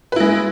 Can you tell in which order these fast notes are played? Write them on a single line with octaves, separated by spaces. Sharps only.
B4 E4 G#3